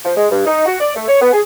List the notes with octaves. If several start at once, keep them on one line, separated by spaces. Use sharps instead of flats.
F3
G#3
G2
D#4
F#4
D5
A3
C#5
B3
G#4